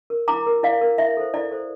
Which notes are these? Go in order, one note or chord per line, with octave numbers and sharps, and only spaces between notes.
A#4
E4 A#5 D6
A#4
E4 D5 F5
A#4
E4 E5
A4 C5
E4 D5
A4 C5